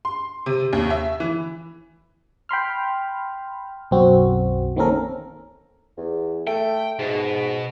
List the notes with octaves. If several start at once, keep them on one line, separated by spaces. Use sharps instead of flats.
C6
C3
D#2
E5
E3
G5 B5 C6 F6
B1 F#2 C4 F#4
D#3 A#3 C4 C#4 A4 A#4
E2
A3 G5
G#2 B2